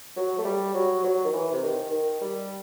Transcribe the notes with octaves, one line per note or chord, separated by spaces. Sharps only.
F#3
A3
G3
F#3
F#3
D#3
E3
C3
D#3
D#3
G3